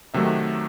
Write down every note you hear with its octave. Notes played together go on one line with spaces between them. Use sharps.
C3 D#3 F#3 A3 E5